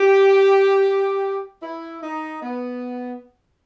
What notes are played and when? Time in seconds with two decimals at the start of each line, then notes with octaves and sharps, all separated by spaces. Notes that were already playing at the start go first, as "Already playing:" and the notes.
Already playing: G4
1.61 E4
2.02 D#4
2.41 B3